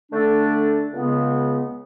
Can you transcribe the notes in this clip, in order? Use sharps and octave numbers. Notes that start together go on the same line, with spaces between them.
D3 A3 D4 A4
C#2 C#3 G#3 B3